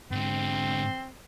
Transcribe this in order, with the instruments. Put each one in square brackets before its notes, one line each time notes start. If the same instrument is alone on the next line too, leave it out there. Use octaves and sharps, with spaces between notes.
[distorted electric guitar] G#2 D3 [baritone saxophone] C4